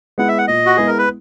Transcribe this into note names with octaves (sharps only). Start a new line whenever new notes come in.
G#3 B3 E4 F#5
E5
F#5
A#2 D#5
F#4
G#3 B3 E4 G#4
A#4
B4